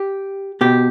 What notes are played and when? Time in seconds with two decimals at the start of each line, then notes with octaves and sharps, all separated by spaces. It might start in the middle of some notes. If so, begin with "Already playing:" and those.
Already playing: G4
0.61 B2 G4